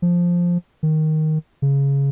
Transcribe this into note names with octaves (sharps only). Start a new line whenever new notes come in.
F3
D#3
C#3